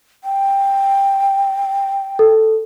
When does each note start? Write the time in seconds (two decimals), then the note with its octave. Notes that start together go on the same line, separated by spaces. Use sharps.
0.24 G5
2.19 A4